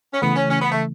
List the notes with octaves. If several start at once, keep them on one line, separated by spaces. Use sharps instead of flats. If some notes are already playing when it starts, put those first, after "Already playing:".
C#4
C#3 E3 A3 B3
C#4
C#4
B3
A3